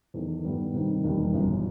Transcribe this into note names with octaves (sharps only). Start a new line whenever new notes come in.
E2 D#3 A3
G2 D#3 G3 B3
C3 D#3 G3
E1 D#2 D#3 G3
G1 F#2 E3